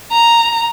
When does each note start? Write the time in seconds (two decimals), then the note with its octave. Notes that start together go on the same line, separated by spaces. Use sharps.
0.12 A#5